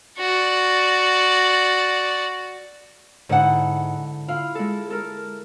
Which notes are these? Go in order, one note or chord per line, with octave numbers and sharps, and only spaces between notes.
F#4 D5
G#2 D3 E4 F#5
E4 F4 F5
G#3 A4
A4 A#4